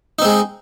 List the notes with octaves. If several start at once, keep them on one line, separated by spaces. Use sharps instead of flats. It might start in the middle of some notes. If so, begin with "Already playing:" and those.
G#3 C4 D#4